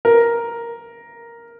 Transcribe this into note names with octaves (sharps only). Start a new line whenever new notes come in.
A#4